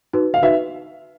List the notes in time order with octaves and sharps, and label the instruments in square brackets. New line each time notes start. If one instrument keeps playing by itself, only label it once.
[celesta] D#4 F#4 B4
[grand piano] F5
[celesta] D#4 F#4 B4 [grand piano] E5